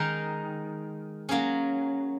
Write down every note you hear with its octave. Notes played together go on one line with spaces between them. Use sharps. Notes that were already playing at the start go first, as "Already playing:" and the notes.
Already playing: D#3 G#3 D#4 A#4
F#3 A#3 C#4 G#4